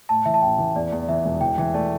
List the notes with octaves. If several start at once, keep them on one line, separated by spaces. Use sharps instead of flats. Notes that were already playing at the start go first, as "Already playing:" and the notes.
A2 A5
E3 E5
A5
A1 G5
E3
E2 D5
E2
E3 E5
E1
E3 G5
E3
A3 D5